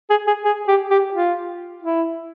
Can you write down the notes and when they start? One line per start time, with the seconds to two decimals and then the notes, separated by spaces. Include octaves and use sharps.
0.10 G#4
0.27 G#4
0.45 G#4
0.68 G4
0.91 G4
1.14 F4
1.83 E4